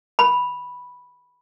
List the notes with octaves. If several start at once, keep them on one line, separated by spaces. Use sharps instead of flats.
B5